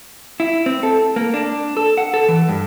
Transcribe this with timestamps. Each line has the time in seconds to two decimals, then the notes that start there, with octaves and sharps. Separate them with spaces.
0.40 E4
0.66 C4
0.83 A4
1.16 A#3
1.34 D4
1.77 A4
1.98 F#5
2.14 A4
2.28 E3
2.49 G2